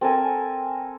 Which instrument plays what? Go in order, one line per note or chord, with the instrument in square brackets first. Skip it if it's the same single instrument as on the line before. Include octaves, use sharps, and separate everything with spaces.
[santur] C4 A4 A#4 G#5